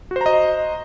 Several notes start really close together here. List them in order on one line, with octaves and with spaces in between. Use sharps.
F#4 C5 A#5 D#5